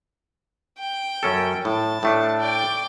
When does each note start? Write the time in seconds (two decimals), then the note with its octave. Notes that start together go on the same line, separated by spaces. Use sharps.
0.79 G5
1.23 F#2 C#4 A4
1.65 A2 A5
2.03 A2 A3 D4
2.40 D5 G5